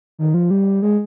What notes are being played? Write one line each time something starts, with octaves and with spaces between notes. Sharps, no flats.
D#3
F3
G3
G#3